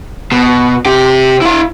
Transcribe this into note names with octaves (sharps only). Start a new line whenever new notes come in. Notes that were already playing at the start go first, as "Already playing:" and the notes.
B2
C3 G4
E4 F5